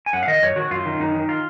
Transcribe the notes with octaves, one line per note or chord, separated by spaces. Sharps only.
G#5
F#2 F#5
F5
D#3 D#5
F#2 C#5
D#3 F#4
F#2 F4
D#3
F#2 D#4
D#3
F4